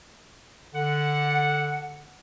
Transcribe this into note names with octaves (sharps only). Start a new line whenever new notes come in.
D3 F#5